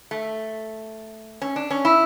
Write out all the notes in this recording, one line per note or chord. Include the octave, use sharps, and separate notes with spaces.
A3
C#4
D4
C#4
E4